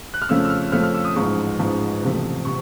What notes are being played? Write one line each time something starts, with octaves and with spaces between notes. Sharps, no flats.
F#6
F6
F2 C#3 F3 A3 C#4 E6
E6
F6
F2 C#3 F3 A3 C#4 F6
F6
E6
D#6
A1 G#2 F3 G#3 C#6
A1 G#2 F3 G#3
F#1 E2 C3 F3 A3
C3 C#6